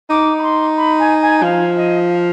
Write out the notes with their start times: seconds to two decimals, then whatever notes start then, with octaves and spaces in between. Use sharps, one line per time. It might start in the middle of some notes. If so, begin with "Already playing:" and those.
0.10 D#4 D6
0.38 B5
0.43 C6
0.77 B5
0.99 G#5
1.21 G#5
1.43 F3 F5
1.76 D#5
2.10 F5